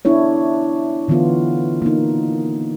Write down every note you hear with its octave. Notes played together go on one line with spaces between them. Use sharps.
B3 D4 E4 C#5
D3 E3 A3 B3 F4
A#3 D#4